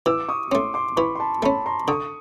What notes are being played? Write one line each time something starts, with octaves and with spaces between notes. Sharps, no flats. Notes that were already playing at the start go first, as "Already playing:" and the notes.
E3 D6 E6
C#6 D#6
A3 C#4 C6 D6
C6 D6
E3 B5 C#6
C6
A5 B5
A3 C#4 A5 B5
A#5 C6
D3 C#6 D#6